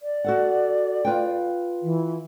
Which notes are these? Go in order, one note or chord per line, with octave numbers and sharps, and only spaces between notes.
D5
F#4 A4 F#5
F4 B4 G5
E3